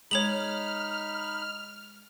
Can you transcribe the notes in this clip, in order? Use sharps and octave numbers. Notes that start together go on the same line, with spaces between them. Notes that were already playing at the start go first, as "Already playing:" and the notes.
G#3 D#4 C#5 B5 F6 F7 F#7